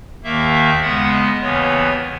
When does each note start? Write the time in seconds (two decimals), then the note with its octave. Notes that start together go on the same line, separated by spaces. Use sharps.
0.23 D#2 D#3 A#3 E5
0.53 E5
0.82 C#3 G#3 B3 F#5
1.11 D#5
1.41 D#2 C#3 E3 B3 C#5